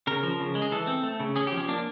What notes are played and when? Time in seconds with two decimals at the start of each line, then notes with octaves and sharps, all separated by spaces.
0.07 C#3 A#4
0.23 F3
0.40 C#3
0.55 G#3
0.62 G#4
0.72 E3 A4
0.87 C4
1.03 A3
1.20 C#3
1.36 C#4 G#4
1.47 G4
1.52 F3
1.57 C#4
1.68 A#3 D4